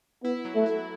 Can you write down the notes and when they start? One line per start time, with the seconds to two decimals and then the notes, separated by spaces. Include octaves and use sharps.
0.23 B3 E4
0.45 F#3
0.55 A3
0.66 E4